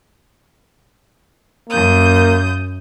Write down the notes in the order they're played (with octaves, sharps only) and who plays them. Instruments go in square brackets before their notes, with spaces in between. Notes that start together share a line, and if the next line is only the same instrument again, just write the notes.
[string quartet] F#2 D#6 G6 [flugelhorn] A#3